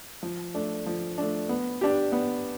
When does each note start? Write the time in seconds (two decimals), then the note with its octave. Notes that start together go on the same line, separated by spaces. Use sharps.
0.23 F3
0.54 A3 D4
0.86 F3
1.18 A3 D4
1.49 B3
1.81 D4 G4
2.12 B3